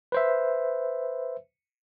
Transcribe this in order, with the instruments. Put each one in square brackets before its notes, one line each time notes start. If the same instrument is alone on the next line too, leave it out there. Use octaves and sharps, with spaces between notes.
[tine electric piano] B4 C5 E5